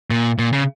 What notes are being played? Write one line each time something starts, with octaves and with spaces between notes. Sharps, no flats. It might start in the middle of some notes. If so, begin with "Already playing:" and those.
A#2
A#2
C#3